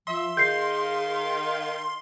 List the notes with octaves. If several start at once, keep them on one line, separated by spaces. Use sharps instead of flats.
F3 E5 C6
D#3 G#4 F5 G6 C7